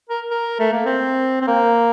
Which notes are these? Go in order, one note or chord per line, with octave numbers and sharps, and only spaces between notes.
A#4
A#4
A3
A#3
C4
C4
A#3